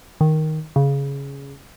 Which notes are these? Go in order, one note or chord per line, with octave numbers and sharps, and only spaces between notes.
D#3
C#3